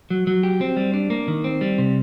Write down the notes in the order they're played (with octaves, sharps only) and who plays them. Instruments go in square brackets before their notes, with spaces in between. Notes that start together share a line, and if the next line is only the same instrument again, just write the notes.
[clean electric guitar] F#3
F#3
G4
C4
G3
D4
A#3
D#3
C4
G3
C3